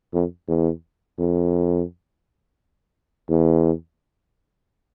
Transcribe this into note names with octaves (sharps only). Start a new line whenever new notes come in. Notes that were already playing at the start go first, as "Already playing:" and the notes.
F2
E2
F2
E2